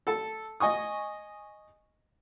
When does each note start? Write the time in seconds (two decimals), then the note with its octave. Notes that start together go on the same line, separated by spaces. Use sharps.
0.07 A4 A5
0.60 D#5 G#5 C#6 D#6